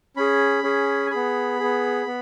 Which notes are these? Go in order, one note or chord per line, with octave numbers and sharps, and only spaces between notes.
C#4 G#4 B5
C#4 G#4
G#5
B3 G#4 B5
B3 G#4
B3